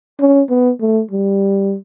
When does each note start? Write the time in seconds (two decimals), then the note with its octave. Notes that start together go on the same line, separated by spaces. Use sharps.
0.20 C#4
0.50 B3
0.81 A3
1.11 G3